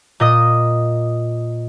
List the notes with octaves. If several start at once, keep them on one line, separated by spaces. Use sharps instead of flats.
A#2 D#5 D#6